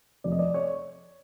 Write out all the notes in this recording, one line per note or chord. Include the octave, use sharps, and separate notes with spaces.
F1 D5
D#5
D5
C#5